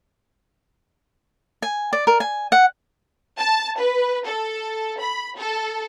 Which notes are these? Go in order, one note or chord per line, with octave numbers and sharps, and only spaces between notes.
G#5
D5
A#4
G#5
F#5
A5
B4
A4
B5
A4